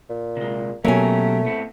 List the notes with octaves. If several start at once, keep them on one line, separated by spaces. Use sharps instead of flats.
A#2
C3 G#3
B2 F#3 A3 A#3 C#4 G4 A#4 G#5
A2 B3 C4